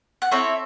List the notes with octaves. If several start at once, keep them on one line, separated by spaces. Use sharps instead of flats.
F#5
C4 E4 A4 C#5 E5